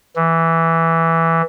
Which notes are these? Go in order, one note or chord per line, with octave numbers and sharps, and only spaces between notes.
E3